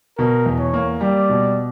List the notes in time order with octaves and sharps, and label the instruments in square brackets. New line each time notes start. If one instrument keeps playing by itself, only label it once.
[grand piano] B2 [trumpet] A#4
[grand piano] E2
[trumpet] C#5
[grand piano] A#3
[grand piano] G3 [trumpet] D5
[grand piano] B2